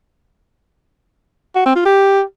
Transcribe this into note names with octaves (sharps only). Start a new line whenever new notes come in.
F#4
C4
F4
G4